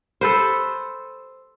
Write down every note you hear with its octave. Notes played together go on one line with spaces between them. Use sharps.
A4 B4 C5